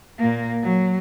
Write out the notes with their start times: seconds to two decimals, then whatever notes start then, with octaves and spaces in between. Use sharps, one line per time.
0.18 A#2 A#3
0.62 F#3